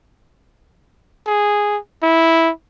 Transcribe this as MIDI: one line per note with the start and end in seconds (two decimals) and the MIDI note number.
1.27 1.78 68
2.03 2.50 64